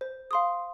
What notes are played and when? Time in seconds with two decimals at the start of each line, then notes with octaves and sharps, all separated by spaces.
0.01 C5
0.31 F5 C6 D#6